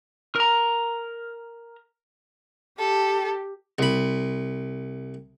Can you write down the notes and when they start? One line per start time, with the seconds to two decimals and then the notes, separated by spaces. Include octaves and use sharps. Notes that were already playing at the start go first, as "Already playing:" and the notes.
0.36 A#4 A#5
2.79 G4 A4
3.79 C2 B5